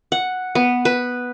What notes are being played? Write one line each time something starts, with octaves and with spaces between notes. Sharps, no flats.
F#5
B3
B4